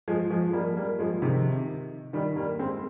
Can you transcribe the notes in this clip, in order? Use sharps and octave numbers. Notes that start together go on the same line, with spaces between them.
F3 G#3
F3 G#3
G3 A#3
G3 A#3
F3 G#3
C3 D#3
D#3 G3
G3 A#3
G#3 C4